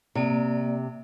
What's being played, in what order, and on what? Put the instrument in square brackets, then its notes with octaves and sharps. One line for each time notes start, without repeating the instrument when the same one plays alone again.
[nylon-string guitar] C3 [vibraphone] A#3 D5